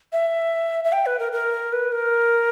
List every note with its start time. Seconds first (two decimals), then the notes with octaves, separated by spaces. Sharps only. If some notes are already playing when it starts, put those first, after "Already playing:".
0.13 E5
0.84 E5
0.93 G5
1.06 B4
1.19 A#4
1.32 A#4
1.73 B4
1.92 A#4